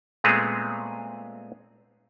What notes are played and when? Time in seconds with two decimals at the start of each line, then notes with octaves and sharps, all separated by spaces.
0.24 A#2 G#3 A3 B3 C4 G#4